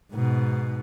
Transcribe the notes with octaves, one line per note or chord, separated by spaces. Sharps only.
G#2 B2